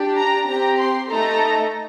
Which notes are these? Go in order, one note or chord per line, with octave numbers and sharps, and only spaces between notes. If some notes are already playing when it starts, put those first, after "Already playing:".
Already playing: D4 G4
A#5
C4 G4 A#5
C6
A3 D#4 A4 A#5